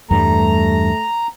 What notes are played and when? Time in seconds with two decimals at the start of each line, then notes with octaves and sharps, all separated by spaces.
0.11 E2 G2 G3 A3 A#5